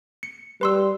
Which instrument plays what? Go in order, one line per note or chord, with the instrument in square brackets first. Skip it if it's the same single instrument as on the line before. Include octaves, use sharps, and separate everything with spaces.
[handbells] C#7
[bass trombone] G3 [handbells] B4 C6 E6